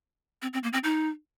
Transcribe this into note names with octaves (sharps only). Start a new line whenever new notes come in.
C4
C4
A#3
C4
D#4